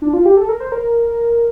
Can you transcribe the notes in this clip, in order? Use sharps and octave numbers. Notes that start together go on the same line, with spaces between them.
D4
F4
G4
A4
A#4
C5
A#4